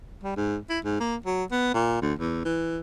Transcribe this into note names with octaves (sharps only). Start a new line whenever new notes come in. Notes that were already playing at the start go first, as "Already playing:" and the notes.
G3
G#2
E4
G#2
A#3
F#3
B3
A#2
D2
E2
E3